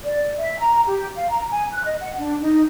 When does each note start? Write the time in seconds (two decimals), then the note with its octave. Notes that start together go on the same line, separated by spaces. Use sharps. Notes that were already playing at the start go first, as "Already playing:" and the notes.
0.04 D5
0.38 E5
0.60 A#5
0.86 G4
1.16 F5
1.29 A#5
1.51 G#5
1.72 F#6
1.84 D#5
2.00 F#5
2.18 D4
2.41 D#4